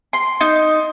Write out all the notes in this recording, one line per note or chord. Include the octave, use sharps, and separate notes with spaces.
C6
D#4